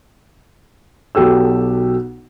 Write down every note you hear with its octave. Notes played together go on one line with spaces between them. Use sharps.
B1 B2 G4 A4 E6